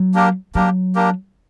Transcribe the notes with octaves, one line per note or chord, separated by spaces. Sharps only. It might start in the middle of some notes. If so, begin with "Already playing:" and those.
Already playing: F#3
A#3 D4 G4 A#4
F#3 A#3 D4 G4 A#4
A#3 D4 G4 A#4